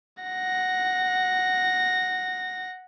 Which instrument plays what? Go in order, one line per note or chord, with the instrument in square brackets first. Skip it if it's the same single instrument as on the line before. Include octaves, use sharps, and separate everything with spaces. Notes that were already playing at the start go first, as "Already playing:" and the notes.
[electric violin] F#5 A#6